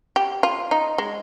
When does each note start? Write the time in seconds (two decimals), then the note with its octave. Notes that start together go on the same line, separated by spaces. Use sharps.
0.16 G4
0.43 F4
0.71 D#4
0.98 G#3